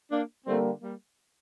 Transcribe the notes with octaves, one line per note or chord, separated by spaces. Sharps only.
A#3 D4
D3 G3 A3 A#3 C4
G3 A#3